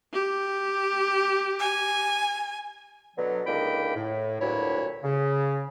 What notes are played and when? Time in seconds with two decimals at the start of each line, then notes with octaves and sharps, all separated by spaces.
0.13 G4
1.59 G#5
3.17 B2 D3 F#3
3.46 C#2 D3 A#3 D#4 G5 B5
3.95 A2
4.40 D2 G2 A#2 F#3 E4 C#5
5.02 C#3